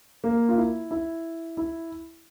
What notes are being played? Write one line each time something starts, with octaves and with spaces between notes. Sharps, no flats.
A#3
F4
E4
E4
E4